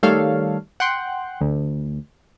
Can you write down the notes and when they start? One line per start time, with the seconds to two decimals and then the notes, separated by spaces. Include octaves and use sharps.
0.03 D#3 G3 A3 A4 C#5 F5
0.80 F#5 G5 C6 F#6
1.41 D2